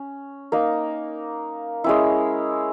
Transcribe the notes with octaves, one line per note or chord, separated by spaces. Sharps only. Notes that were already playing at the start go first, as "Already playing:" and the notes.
Already playing: C#4
A#3 D#4 A#4
G#3 C#4 E4